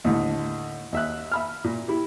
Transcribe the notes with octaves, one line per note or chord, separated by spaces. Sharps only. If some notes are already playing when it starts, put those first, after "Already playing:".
D#2 A2 D3
D#2 E5 F#6
E5 B5 F6
A#2
E4 G4